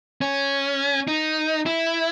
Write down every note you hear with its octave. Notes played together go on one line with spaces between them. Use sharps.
C#4
D#4
E4